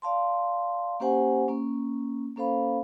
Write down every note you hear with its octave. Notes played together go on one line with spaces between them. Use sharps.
D5 F5 A5 C6
A#3 C#4 G4 C5 F#5 G#5
A#3 C#4
A#3 C#4 A4 C5 F5 B5